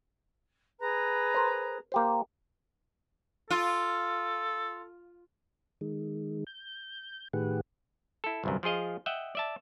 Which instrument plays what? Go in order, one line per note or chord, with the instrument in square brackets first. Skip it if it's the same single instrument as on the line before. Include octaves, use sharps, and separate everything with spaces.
[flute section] G#4 B4 A#5
[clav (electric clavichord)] A#4 C5
A#3 G4 C5
[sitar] F4 [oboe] A4
[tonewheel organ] D#3 G#3
G6
A2 D#3 G4 G#4 B4 F#5
[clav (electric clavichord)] E4 A4
G1 C2 F#2
F3 F4 G#4 D#5 F5
D#5 E5 F#5 G5
D5 E5 A5